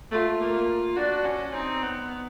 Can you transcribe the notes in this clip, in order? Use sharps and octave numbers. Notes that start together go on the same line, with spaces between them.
A3 F4
A#3
D4 F#4
C#4
C4 D#4
B3